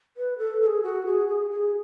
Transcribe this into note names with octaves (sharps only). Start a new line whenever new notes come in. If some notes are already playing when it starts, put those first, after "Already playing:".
B4
A4
A4
G#4
F#4
G#4
G#4
G#4